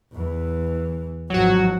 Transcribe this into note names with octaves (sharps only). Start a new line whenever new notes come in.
E2 E3
G#1 F3 F#3 F#4